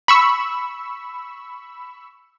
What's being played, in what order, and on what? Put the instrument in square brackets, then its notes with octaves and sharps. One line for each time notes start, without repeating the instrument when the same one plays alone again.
[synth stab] B5 C#6 E6